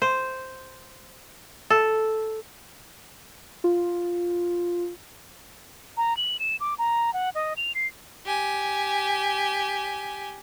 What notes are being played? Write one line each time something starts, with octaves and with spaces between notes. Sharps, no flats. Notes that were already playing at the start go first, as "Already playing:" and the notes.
C5
A4
F4
A#5
F#7
E7
D6
A#5
F#5
D#5
F7
C7
G4 G#5